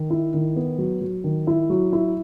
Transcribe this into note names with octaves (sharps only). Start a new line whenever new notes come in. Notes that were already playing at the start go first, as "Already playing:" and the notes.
Already playing: D#3
E4
D#3
B3
F#3
F#3
D#3
E4
F#3
E4